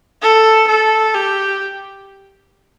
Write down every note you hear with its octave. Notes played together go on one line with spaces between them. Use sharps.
A4
A4
G4